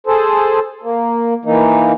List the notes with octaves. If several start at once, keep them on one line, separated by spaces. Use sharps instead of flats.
G#4 A4 C5
A#3
E3 A#3 D#4